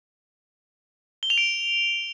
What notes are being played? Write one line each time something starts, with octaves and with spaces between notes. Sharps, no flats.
G7
F7
D7